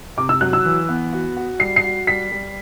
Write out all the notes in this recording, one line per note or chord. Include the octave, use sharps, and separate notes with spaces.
C3 D6
E6
F#3 F#6
E6
E3
B3
F#4
F#4
G3 C7
C7
F#4
G3 B6
G3